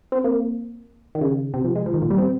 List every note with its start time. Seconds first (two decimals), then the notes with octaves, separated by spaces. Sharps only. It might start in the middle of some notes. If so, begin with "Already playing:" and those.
0.12 C4
0.24 A#3
1.15 D#3
1.21 C#3
1.54 C3
1.64 F3
1.76 G#3
1.86 F3
1.94 D#3
2.02 A#2
2.10 G3
2.18 C4